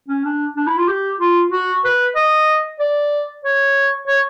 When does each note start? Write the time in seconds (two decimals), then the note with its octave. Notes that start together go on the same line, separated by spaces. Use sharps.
0.08 C#4
0.24 D4
0.56 D4
0.67 E4
0.78 F4
0.88 G4
1.20 F4
1.52 F#4
1.85 B4
2.16 D#5
2.80 D5
3.44 C#5
4.07 C#5